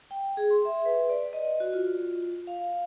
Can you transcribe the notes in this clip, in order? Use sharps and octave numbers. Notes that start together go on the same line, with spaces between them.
G5
G#4
C6
E5
B4
D5
D#5
F#4
F4
F5